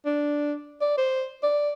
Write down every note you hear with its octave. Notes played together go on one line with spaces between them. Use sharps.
D4
D5
C5
D5